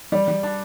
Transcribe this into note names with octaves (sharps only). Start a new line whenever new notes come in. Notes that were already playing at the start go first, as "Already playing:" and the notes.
G3 D5
G3
D4